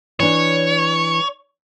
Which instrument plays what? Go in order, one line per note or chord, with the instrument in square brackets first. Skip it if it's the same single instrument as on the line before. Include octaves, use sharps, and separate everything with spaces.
[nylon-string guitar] E3 D4 [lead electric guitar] C#5